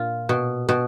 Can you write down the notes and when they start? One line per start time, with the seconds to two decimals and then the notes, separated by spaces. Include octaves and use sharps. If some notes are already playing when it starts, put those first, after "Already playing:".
Already playing: A#2 F4
0.29 B2
0.69 B2